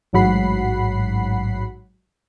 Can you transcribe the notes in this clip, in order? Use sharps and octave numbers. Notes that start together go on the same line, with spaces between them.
A1 G#2 F#3 F#5 B5 C7